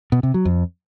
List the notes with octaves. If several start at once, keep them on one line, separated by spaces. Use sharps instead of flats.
B2
C3
F#3
F2